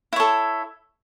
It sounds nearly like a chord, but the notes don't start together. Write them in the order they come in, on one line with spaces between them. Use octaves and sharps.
E4 C#5 A4